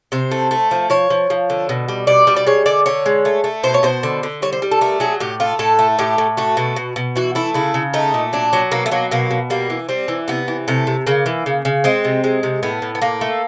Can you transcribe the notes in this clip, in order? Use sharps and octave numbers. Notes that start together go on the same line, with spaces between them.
C3 C5
A3
A3
F3
F3 C#5
F3
F3
D3
B2
G3
B2 D5
G3
D5
G#3 C#5
D3 D5
D3 C#5
G#3
A3
A3
B2 C5
C#5
B2 C5
D3
D3
G3 C#5
C5
G3
A4
A3 A#4
F#3 G#4
A2 G4
A3 F4
A2 A4
A3
A2 G4
A2
A3 F#4
B2
B2
B2
E3 F#4
A3 E4
C#3 E4
C#3
A3 D#4
A#2
F#3 D4
F#3
B2 A#3
A3
F#3 A#3
B2 A#3
B2
G3 A#3
E3
G3 C4
E3
C3 B3
E3
C3 A3
C3
C#3 A#3
E3
C#3
C#3
G#3 C4
C3
G#3
C3
A2 B3
A2
B3
A2 A#3
A3